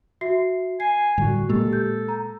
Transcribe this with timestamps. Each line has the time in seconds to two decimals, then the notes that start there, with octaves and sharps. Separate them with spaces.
0.21 F#4 E5 C7
0.80 G#5 C7
1.18 A2 D3 G3 F#4
1.49 A#2 G#3 A#3 G4 A4
1.73 G6
2.08 A#5